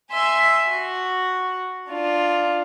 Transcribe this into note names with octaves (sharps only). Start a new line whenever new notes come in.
E5 G#5 C6
F#4
D4 F4